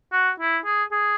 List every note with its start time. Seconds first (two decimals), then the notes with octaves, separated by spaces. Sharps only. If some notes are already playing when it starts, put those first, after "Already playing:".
0.12 F#4
0.40 E4
0.65 G#4
0.92 G#4